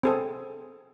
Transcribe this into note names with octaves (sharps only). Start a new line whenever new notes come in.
C4 G#4 A4